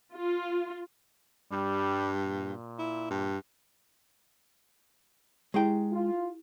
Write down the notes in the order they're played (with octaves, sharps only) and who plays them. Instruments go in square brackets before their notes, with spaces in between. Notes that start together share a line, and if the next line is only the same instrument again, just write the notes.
[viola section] F4
[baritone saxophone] G2 [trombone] G3
[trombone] A#2
[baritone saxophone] E4
G2
[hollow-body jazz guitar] G#3 G#4 G5 [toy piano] E4 G4
[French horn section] F4